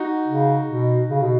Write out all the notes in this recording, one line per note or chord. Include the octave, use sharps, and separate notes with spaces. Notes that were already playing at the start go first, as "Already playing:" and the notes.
Already playing: D#4 F#4
C#3
B2
C#3
B2